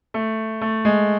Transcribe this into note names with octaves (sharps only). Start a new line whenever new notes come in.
A3
A3
G#3